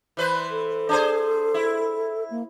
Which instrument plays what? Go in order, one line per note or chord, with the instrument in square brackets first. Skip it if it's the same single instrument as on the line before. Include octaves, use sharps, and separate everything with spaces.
[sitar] E3 B4 C5
[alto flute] A4
[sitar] D4 G#4 C5
E4
[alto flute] A#3